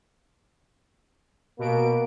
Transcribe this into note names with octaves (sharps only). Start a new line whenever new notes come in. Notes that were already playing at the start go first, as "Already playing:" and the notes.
B2 A#3 D7